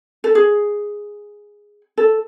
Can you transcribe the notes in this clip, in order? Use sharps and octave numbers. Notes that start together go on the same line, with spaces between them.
A4
G#4
A4